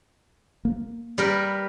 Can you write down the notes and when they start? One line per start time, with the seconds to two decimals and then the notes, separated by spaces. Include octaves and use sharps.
0.65 A#3
1.18 G3 A#4 B4